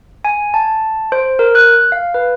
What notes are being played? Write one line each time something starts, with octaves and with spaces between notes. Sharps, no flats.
G#5
A5
C5
A#4
F#6
F5
B4